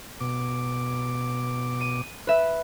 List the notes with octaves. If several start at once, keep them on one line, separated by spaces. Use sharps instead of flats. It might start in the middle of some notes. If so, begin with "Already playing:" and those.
B2 D6
D#7
B4 E5